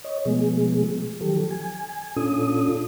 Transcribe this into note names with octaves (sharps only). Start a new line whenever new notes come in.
C#5 D#5
B2 F3 G#3 A3 B3 G#4
D#3 F3 F#3 G4 A4
G#5
A#2 C#4 D4 F4 A4 D#6